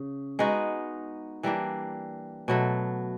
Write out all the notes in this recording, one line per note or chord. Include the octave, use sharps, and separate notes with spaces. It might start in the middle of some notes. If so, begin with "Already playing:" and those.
Already playing: C#3
G#3 B3 D#4 F#4
E3 G3 A#3 D4
B2 F#3 A3